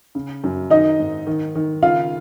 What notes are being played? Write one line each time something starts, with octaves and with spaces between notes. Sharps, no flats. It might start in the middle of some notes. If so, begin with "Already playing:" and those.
C#3
F#2
D#3 D#4 D#5
G#2
D#3
D#3
C#3 F4 F5